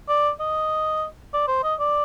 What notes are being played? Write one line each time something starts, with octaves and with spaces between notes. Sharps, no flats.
D5
D#5
D5
C5
D#5
D5